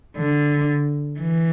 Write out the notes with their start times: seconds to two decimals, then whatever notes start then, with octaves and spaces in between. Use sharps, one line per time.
0.17 D3
1.20 E3